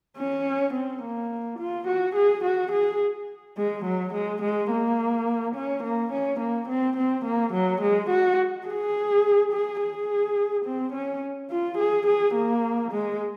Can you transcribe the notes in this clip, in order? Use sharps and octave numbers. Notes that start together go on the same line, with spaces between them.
C#4
C4
A#3
F4
F#4
G#4
F#4
G#4
G#3
F#3
G#3
G#3
A#3
C#4
A#3
C#4
A#3
C4
C4
A#3
F#3
G#3
F#4
G#4
G#4
G#4
C4
C#4
F4
G#4
G#4
A#3
G#3